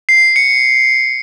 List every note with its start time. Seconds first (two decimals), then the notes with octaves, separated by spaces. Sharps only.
0.09 C7
0.36 C#7